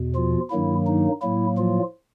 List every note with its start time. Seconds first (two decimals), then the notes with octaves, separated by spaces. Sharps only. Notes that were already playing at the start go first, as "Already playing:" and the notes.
Already playing: E2 B2
0.15 F3 F4
0.50 G2 D#3 F#3 A#3 E4
0.87 D#4
1.22 A2 F#3 A#3 E4
1.58 F3 F4